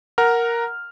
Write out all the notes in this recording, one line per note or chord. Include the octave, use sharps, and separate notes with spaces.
A#4 F#5 A#5 F6